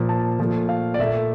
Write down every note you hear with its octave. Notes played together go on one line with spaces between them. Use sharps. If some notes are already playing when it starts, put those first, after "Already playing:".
Already playing: A#2 F3 A#3
A5
A#2 F3 A3
F5
D5
A#2 A3 E5